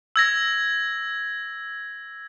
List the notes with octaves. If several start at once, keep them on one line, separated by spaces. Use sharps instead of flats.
E6 G#6 A#6